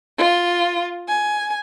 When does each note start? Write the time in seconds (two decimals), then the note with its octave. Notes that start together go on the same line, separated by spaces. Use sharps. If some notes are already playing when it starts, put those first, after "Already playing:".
0.17 F4
1.07 G#5